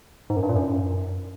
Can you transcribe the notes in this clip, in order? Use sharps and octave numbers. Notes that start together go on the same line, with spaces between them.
G#2
F#2
G2
A#2
F#2